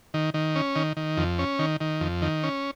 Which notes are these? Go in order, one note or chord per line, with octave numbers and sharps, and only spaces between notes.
D#3
D#3
C#4
D#3
D#3
F2
C#4
D#3
D#3
F2
D#3
C#4